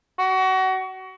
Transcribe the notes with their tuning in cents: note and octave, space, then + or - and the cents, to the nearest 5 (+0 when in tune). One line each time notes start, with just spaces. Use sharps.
F#4 +30